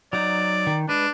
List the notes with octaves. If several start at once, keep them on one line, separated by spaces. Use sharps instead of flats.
F#3 D#4 D5
D#3
G#3 D4 B4